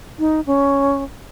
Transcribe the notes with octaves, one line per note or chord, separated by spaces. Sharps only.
D#4
C#4